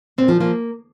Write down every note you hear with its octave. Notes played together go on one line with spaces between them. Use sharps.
A#2 C4
F3 F4
F3 A#3 F4